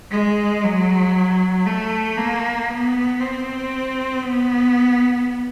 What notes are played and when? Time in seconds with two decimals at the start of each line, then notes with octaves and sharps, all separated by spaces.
0.12 G#3
0.63 F#3
1.67 A3
2.18 A#3
2.70 B3
3.21 C4
4.24 B3